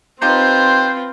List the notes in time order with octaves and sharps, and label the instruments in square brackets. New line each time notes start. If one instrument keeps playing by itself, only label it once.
[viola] C4 [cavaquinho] D#4 G4 [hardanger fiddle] F4 B4 [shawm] C5